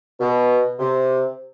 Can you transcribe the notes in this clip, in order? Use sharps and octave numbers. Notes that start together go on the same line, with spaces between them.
B2
C3